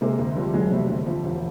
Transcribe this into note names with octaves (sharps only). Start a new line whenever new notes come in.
C3 G#3 A#3
D2
F3 G3
E1 F#3 G#3
C3 G3 A3
D2
F3
E1